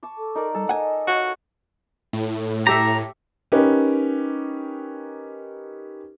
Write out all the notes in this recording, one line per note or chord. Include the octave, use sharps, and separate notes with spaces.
A5 C#6 D6
A4
D#4 A#4 D5
G3 A4
D#5 F#5 G#5
F#4 C#5 F5 C#6
A2
G4 A4 E5 A#5
C#4 D#4 G4 A#4 B4